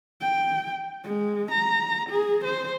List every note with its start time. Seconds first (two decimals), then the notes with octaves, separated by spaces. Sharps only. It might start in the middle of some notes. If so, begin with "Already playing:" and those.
0.21 G5
1.04 G#3
1.51 A#5
2.10 G#4
2.45 C5